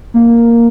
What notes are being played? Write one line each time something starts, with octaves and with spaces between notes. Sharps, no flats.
A#3